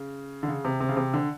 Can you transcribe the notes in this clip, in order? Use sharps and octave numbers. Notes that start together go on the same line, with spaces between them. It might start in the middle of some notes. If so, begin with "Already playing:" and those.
Already playing: C#3
D3
C#3
C3
C3
C#3
C3
D3